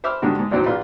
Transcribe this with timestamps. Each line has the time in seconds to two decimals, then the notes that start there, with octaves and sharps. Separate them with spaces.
0.04 C5 E5 B5 D6 E6 F6
0.22 G#2 D3 D#3 G3 D4 F#4
0.39 G#2
0.51 A1 D#2 F#3 C4 D#4
0.66 A#1 F4 B4